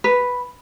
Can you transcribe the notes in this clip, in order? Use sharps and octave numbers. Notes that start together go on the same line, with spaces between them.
B4